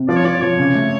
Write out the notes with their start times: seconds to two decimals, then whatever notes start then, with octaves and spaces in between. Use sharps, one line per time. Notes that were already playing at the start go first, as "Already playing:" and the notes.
Already playing: C3
0.09 F3 D5
0.17 C#5
0.25 F3 D5
0.42 F3 C#5
0.59 C#3
0.75 A3